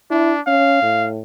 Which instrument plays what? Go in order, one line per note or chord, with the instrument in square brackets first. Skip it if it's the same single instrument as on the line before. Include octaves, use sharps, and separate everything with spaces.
[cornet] D4 [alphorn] E4
[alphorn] C#4 [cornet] F5
[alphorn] A2